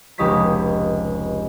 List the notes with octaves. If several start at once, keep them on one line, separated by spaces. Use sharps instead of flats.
F1 C#2 G4 D#5 C#6 B6